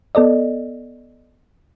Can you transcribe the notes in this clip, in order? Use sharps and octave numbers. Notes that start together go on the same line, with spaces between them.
B3 A4 D5 D#5